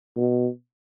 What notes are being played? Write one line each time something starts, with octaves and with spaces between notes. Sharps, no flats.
B2